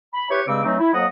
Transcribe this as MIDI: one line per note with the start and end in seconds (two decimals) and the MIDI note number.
0.13 0.30 83
0.30 0.41 64
0.30 0.41 67
0.30 0.41 71
0.30 0.41 73
0.47 0.62 43
0.47 0.62 49
0.47 0.62 56
0.47 0.62 60
0.47 0.62 86
0.47 0.62 88
0.64 0.78 52
0.64 0.78 54
0.64 0.78 57
0.64 0.78 60
0.64 0.78 63
0.79 0.93 64
0.94 1.06 41
0.94 1.06 54
0.94 1.06 58
0.94 1.06 75
0.94 1.06 78
0.94 1.06 87